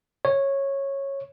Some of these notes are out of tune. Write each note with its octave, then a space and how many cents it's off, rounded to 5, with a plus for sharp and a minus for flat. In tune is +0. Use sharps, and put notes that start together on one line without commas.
C#5 -10